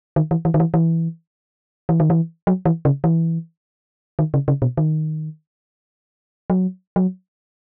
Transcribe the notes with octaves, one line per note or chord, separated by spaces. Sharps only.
D#3
E3
E3
D#3
E3
E3
E3
D#3
E3
F#3
E3
C#3
E3
D#3
C#3
C#3
B2
D#3
F#3
F#3